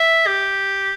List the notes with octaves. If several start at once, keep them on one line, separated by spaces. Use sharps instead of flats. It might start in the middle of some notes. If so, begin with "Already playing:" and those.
Already playing: E5
G4